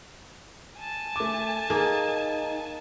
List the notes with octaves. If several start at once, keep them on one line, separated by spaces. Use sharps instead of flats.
G#5 A5
A3 D6
A#3 D#4 G#4